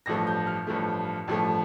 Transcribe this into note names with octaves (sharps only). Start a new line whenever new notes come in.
A1 G2 F3 A3 A#6
G6
F6
A1 G2 F3 A3
A1 G2 F3 A3